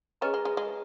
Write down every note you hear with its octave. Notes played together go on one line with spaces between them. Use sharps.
C#4 G#4 B4 D#5 A#5
G#3
G#3
G#3